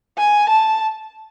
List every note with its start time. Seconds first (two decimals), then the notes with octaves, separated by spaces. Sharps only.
0.18 G#5
0.49 A5